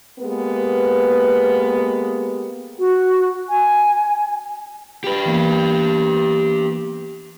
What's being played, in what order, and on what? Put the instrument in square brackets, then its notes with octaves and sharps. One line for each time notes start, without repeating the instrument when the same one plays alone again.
[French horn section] G#3 A#3 B3 G4 B4
[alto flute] F#4
G#5
[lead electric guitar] G4 B4
[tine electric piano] E3 A#3 B3